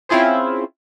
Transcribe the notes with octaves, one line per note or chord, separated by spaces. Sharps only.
C4 C#4 E4 F4 G#4 C5